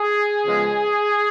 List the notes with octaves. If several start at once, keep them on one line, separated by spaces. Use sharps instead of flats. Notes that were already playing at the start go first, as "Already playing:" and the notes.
Already playing: G#4
C#3 F3 G#3 B3